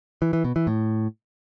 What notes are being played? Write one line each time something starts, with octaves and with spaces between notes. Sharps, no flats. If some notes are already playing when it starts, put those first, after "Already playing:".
E3
E3
B2
E3
A2